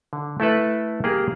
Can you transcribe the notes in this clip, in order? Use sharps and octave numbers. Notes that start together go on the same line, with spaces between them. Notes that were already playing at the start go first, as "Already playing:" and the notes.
D3
A3 E4 A4 B4
A#3 G4 G#4